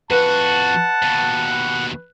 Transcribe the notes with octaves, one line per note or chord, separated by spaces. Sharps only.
F2 F#4 B4 F#5 A5
D#2 B2